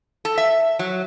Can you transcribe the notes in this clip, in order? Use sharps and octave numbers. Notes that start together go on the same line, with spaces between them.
A4
E5
F#3